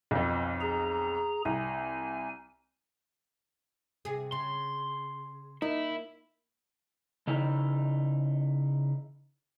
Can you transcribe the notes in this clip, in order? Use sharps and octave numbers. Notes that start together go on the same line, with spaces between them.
B1 F2
G#4 A#5
C2 G#5
C3 G#4
C#3 C6
A#3 D#4 E4
C#3 D#4 E4